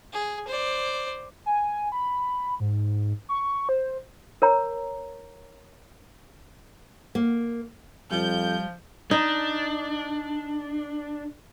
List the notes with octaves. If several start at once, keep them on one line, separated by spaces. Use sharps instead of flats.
G#4
C5 D5
G#5
B5
G#2
C#6
C5
A#4 C#5 A#5
A#3
F2 F3 G3 G6
D4 D#4